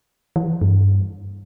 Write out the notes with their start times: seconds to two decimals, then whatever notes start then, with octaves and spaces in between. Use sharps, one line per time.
0.36 E3
0.61 G2